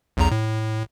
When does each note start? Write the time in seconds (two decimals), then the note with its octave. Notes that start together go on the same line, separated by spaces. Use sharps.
0.17 B1 E2 A#5
0.31 A2